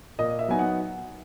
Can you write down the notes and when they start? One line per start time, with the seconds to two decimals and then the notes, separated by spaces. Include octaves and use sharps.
0.19 A#2 D#5
0.39 E5
0.48 F#3 B3 D#4 G#5
0.59 F#5